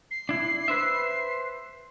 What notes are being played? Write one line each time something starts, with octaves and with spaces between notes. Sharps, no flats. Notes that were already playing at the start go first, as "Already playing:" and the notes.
C7
D4 E4
B4 C5 E5